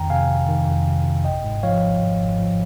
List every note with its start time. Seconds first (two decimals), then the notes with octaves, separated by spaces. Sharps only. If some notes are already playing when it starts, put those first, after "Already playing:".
Already playing: F2 D#3 G5 A#5
0.10 C3 F5 G#5
0.29 G1
0.49 D#3
0.67 F2
0.87 C3
1.06 G1
1.25 G#1 D#5 G5
1.44 G#2
1.63 F3 C#5 F5
1.82 G#1
2.01 G#1
2.21 G#2
2.40 F3